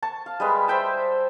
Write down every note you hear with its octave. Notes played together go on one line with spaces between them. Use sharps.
A5 C#6
F5
G3 G#3 B4
C5 E5 G5 A5